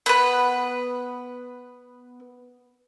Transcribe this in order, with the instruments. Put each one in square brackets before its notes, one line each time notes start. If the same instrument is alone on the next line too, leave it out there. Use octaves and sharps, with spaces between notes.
[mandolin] B3 B4